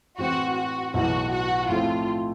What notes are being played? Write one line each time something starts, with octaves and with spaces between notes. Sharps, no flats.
A2 E3 G#3 C4 F#4
F#4
B1 A2 E3 G#3 F#4
F#4
A2 F3 A3 C4 F4